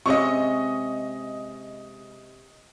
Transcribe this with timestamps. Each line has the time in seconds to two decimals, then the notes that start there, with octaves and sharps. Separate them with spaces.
0.06 C3 G#3 C#4 D#5 C#6